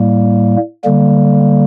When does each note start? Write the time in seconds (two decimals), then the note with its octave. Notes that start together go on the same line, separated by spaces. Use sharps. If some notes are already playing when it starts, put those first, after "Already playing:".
Already playing: A2 G3 A#3
0.84 D3 G3 A#3